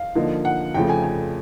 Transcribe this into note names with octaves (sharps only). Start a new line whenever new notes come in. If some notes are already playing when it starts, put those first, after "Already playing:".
Already playing: F5
D3 F3 A#3 D#4
F#5
F2 C#3 F3 A3 G5
G#5
G#5